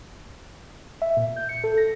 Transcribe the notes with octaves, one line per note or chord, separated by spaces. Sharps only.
E5
A#2
G6
C#7
A4
A#6